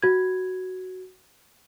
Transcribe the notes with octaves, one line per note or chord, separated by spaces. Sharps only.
F#4 G#6